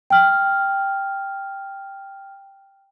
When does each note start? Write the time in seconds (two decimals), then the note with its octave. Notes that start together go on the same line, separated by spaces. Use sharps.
0.10 G5 F6